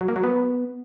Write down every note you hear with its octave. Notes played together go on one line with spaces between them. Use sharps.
F#3
A#3
F#3
B3